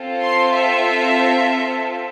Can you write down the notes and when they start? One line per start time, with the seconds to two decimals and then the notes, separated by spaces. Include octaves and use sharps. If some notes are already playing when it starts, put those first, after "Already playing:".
Already playing: C4 F4 A4
0.22 C6
0.53 E5